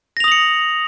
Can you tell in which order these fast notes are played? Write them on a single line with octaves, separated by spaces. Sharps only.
A#6 F7 D#6 F#7 C#7